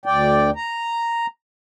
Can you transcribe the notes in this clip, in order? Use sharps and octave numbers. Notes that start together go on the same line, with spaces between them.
D2 D5 G5
A#5